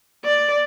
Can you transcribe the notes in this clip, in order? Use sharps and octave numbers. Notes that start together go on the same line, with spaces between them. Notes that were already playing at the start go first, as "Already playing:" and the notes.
D5